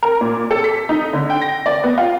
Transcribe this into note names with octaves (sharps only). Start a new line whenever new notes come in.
A#4
A#2
A4
B6
D#4
D3
G5
A#6
D5
B3
F4